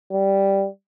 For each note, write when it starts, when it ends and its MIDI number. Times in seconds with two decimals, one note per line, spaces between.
0.12 0.66 55